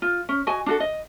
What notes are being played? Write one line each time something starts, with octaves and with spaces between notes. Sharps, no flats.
F4
C#4
F#4 D#5 G#5
D4 F#4 A4
D#5